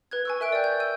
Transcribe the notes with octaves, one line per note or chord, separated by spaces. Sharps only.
B4 F#6 G#6
G#5 C#6 E6
A#4 E5 G#5 F#6 D7
D5 G5 G6
G6
E6 G6 D#7